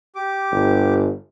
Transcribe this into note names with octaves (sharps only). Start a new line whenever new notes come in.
G4 D6
G1